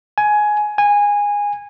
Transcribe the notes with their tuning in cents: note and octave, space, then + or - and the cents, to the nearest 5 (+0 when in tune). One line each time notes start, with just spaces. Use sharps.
G#5 +15
G#5 -15